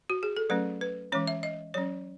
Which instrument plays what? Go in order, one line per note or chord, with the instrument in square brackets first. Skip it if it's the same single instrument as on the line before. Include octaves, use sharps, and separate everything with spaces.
[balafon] F#4
G#4
A4
F#3 A3 C#4 B4
B4
E3 G#3 C#4 C#5
E5
D#5
F#3 C#4 C#5